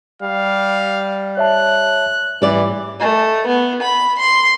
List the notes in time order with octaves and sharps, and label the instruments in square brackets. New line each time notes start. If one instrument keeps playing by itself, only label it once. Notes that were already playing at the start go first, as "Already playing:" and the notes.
[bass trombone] G3 [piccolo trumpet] F5
[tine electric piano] C#5 E5 A5 [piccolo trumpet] F#6
[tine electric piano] G#2 [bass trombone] E3 [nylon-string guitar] G3 D5
[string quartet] A3
B3
B5
C6